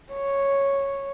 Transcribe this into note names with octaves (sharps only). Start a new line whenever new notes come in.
C#5